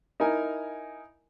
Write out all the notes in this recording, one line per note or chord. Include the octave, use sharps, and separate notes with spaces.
D#4 E4 A#4 G#5